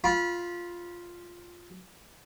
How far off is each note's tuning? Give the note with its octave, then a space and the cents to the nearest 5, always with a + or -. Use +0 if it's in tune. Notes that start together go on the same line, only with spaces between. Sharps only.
F4 +0 B5 -25